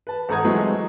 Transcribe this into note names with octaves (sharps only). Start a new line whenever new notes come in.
B4 A5
G#1 A4 F#5 A#5 D#6 G#6
E3 F#3 G#3 A3 C4